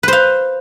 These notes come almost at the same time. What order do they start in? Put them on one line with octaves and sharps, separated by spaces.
B4 C5 F5